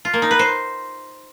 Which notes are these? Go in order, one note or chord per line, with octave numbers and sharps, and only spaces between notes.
F4
A#3
D#4
B4
C5